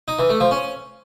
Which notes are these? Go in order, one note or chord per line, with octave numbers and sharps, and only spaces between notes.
D#4
E3
A3
F3
C#4